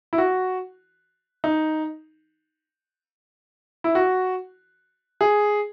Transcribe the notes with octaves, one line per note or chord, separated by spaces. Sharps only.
E4
F#4
D#4
E4
F#4
G#4